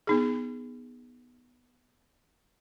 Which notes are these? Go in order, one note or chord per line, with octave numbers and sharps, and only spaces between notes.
B3 D#4 G#4